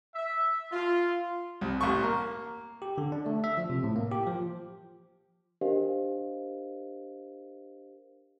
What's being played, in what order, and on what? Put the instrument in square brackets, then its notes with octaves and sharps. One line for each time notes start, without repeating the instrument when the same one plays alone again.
[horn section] E5
F4
[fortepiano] C2
A1 C#6
A#3
[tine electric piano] G4
D3
D4
A3
E5
F3
C3
A2
A#3
G4
F3
[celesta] D4 G4 A#4 C5 D#5 F5